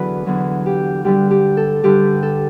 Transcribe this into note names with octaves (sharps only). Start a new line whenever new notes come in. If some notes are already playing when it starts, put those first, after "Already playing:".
Already playing: E2 D3 F#3 B4 D5
E2 D3 F#3
G4
G2 D3 G3 G4
G4
A4
G2 D3 G3 G4
A4